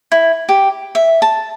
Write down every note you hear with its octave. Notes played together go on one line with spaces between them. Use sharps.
E4
G4
E5
A5